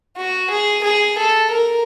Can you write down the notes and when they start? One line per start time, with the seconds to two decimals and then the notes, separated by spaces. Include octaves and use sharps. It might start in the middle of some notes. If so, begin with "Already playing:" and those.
0.17 F#4
0.50 G#4
0.84 G#4
1.18 A4
1.51 A#4